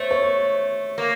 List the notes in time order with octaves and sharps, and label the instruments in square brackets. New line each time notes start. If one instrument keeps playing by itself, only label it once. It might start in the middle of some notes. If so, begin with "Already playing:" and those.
Already playing: [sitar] A3 [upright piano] C5 C#5
[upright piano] C#5
[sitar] A#3